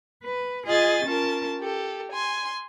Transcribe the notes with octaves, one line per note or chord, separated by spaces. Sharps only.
B4
F4 G#4 D#5 G#5 A6
C#4 F4 A#4 A5
G4 A4
G#5 C6